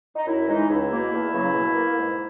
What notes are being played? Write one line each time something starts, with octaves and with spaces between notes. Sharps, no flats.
D#4
F#2 E4
E3 G#3 D#4
C#2 E4
B2 A#3
E2
C#3 F#3 A#3
B2
A#3
G#2